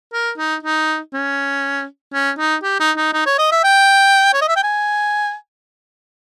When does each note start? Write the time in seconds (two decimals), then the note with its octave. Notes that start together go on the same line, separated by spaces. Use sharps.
0.13 A#4
0.38 D#4
0.63 D#4
1.14 C#4
2.14 C#4
2.38 D#4
2.63 G4
2.80 D#4
2.97 D#4
3.13 D#4
3.26 C#5
3.39 D#5
3.51 E5
3.64 G5
4.34 C#5
4.41 D#5
4.48 E5
4.56 G5
4.63 G#5